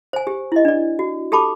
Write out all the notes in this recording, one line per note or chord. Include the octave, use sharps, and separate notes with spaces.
C5 G#5
G4
E4 D#5
D4 D5
F#4
G4 A4 A5 B5 D6